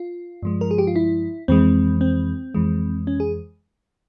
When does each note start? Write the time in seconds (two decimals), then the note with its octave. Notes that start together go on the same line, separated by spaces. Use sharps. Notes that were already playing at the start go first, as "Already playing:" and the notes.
Already playing: F4
0.43 G2 F3 G#3
0.61 A#4
0.71 G#4
0.78 G4
0.87 F4
0.96 E4
1.48 F2 E3 G#3 C4
2.01 C4
2.54 F2 E3 G#3
3.07 C#4
3.20 G#4